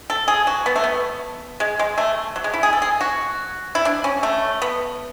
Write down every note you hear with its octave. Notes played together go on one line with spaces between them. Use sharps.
A4
G#4
F#4
B3
A3
B3
G#3
G#3
A3
F#3
G#3
E4
G#4
A4
G#4
F#4
E4
D4
C#4
A3
B3